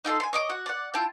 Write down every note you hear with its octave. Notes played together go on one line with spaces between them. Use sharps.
D#4 F4 A4 C6
G#5 C6
C#5 D#5 D6
F#4 F#5
D5 F#5
E4 F4 G5 A5